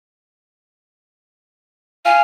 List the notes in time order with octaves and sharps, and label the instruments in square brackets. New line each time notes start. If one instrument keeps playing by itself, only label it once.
[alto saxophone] F5 [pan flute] G#5